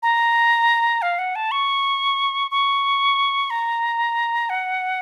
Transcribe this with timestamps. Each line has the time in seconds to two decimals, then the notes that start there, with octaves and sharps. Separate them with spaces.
0.03 A#5
1.02 F5
1.19 F#5
1.36 A5
1.51 C#6
2.51 C#6
3.50 A#5
4.50 F#5